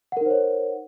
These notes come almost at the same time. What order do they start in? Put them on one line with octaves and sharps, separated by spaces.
F#5 A#4 D#4 C5 C#5